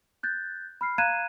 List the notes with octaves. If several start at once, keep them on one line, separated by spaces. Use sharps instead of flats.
F#6 G6 A6
B5 F6 C7
F5 A#5 F#6 G#6 D#7 E7